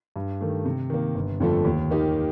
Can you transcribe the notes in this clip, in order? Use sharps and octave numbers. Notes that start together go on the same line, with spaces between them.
G2
D#3 A3
C3
D#3 A#3
G1
F2 D3 F3 A3
D#2
D#3 A#3 D#4 G4